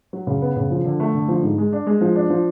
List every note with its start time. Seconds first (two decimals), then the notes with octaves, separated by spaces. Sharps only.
0.13 F#3
0.27 C#3
0.42 B3
0.56 C#3
0.71 F3
0.85 D3
1.00 A3
1.15 D3
1.28 F3
1.43 G#2
1.58 G#3
1.73 D4
1.87 G#3
2.01 F3
2.16 D4
2.30 F3